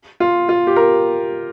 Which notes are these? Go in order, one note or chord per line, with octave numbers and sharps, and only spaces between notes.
F4
F4
G4
A#4